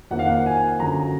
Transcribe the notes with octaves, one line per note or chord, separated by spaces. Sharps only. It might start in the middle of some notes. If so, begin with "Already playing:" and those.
F2 D#3 A#3 F#5
F5
F#5
G#5
F#2 D3 F#3 A#5